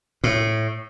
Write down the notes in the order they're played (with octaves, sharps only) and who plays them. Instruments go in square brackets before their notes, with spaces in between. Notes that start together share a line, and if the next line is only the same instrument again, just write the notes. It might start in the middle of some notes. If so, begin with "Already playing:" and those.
[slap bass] A2